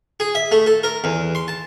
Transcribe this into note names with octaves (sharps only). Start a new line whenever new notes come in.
G#4
E5
A3
A4
A#4
E2
C6
A5